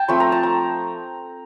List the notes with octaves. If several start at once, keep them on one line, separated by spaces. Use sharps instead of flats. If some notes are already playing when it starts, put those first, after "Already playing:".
Already playing: G5 A5
F3 A3 C4 B5
A#5
A5
A#5